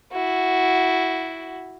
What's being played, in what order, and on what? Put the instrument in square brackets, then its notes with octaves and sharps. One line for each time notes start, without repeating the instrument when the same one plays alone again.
[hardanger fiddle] E4 F#4